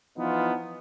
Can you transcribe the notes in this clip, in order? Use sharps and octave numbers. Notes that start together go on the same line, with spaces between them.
E3 F3 B3 D#4 F4